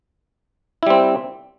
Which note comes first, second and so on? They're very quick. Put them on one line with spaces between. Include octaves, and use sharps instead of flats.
E4 G3 C4